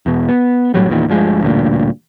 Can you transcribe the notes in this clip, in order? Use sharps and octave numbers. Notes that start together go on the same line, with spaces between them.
E2 B2
B3
B1 A2 F#3 G3
E2 A#2 D#3
G1 D2 F3 G#3
A1 D2 G2 A#2